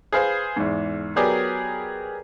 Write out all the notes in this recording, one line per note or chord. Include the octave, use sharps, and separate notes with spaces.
G#4 B4 C5 F5
E2 G#2
F#3 B3 G4 G#4 A#4 D5